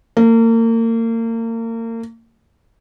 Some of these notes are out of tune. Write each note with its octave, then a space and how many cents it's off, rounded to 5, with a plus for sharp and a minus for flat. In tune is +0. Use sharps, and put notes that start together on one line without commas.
A#3 -35